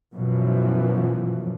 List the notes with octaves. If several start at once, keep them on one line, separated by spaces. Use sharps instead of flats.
F#2 B2 E3 F3